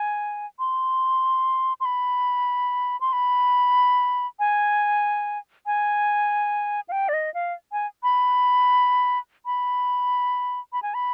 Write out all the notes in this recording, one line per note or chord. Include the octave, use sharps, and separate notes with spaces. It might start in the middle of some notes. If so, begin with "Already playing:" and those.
Already playing: G#5
C6
C6
B5
C6
B5
G#5
G#5
F5
G5
D5
D#5
F5
G#5
B5
B5
B5
G#5
B5